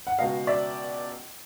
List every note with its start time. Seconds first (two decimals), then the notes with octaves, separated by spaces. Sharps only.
0.07 F#5
0.19 C#2 B2 D#5 F5
0.47 D5 E5